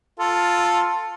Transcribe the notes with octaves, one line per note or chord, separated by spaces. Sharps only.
F4 A4